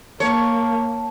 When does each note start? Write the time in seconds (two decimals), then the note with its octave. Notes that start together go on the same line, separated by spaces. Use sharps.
0.20 A#3 C#5 A5